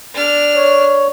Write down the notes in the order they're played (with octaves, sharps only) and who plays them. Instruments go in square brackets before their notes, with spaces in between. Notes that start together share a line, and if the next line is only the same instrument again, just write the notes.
[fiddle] D4 F6
[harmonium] C#5